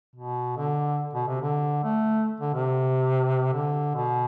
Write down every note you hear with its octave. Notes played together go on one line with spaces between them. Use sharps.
B2
D3
B2
C3
D3
A3
D3
C3
D3
B2